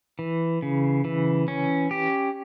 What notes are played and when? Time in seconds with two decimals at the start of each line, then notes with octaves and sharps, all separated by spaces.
0.19 E3
0.62 C#3
1.05 E3
1.48 C#4
1.91 G4